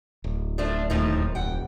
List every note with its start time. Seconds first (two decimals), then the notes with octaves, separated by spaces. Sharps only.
0.24 D1
0.58 F3 A3 D4
0.90 D#2 A2 F3 D#4
1.18 D#2
1.35 F1 F#5 G5